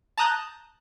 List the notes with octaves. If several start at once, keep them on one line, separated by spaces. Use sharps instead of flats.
A5 A#5 D#6 F#6 G6